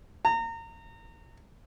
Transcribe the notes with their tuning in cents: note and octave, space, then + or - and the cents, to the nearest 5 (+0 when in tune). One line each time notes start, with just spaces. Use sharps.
A#5 -30